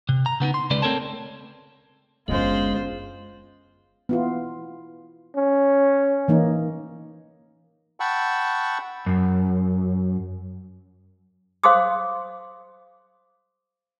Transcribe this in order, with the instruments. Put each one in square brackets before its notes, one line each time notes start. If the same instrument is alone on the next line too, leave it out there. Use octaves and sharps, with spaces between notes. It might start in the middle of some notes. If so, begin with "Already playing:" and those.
[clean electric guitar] C3
A#5
C#3 B3 D4 D#4
C6
C#2 C#3 G#3 B4 D5
A3 C4 A4 A#4 C#5 A5
[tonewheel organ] F#1 B3 [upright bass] F#2 D3 [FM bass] G#3 [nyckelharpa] F4 C5
[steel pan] B3 E4 F4
[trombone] C#4
[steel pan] E3 A#3 D#4
[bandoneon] F#5 G5 A5 B5 C#6 E6
[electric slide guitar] F#2
[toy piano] C5 F5 C6 D6 D#6